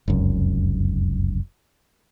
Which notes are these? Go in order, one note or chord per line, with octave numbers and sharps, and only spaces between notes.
F1 C#2 F#2